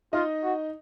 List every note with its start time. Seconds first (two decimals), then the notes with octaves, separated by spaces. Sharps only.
0.13 D#4 F4 D#5
0.44 F#4